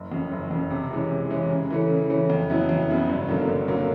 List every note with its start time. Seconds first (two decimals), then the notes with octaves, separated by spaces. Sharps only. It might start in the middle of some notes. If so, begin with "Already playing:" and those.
Already playing: F#1
0.12 F2 C#3
0.32 F#1
0.51 F2 C#3
0.70 C3
0.91 E3 G#3 C#4
1.11 C3
1.30 E3 G#3 C#4
1.50 C#3
1.70 E3 A3 C#4
1.90 C#3
2.09 E3 A3 C#4
2.30 F2
2.50 C#3 F#3 B3 E4
2.69 F2
2.89 C#3 F#3 B3 E4
3.09 G1
3.29 F#2 D3 F#3 A#3
3.48 G1
3.68 F#2 D3 F#3 A#3